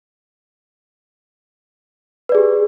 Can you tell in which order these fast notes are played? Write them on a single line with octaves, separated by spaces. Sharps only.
B4 D5 G#4 G4